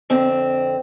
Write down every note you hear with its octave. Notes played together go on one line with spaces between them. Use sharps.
F2 D3 C4